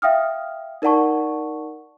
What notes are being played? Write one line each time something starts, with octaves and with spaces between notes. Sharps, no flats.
E5 F5 G5 D#6 F6
D#4 A#4 D5 F#5 A5 C#6